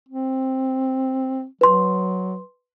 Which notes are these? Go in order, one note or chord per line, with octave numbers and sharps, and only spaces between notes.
C4
F#3 B4 C6